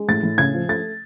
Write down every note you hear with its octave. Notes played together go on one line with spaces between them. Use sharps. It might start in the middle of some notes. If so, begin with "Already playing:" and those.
Already playing: G#3
A2 A6
A2
C#3 G#6
F3
A3 A6